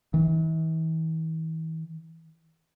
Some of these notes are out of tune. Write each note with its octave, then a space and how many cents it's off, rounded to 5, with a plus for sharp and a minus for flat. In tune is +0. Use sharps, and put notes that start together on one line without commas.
E3 -45